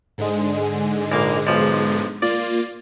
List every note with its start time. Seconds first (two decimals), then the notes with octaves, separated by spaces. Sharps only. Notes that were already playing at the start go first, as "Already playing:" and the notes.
0.18 G#2 D3 G#3
1.12 A#1 A#3 F5
1.47 B1 F3
2.22 A#3 F4 D5